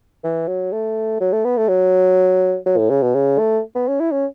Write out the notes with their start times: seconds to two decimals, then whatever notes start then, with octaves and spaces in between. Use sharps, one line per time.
0.24 E3
0.47 F#3
0.72 A3
1.21 F#3
1.33 A3
1.45 B3
1.57 A3
1.68 F#3
2.66 F#3
2.78 A2
2.90 C#3
3.02 B2
3.14 C#3
3.39 A3
3.75 B3
3.88 C#4
4.00 E4
4.12 C#4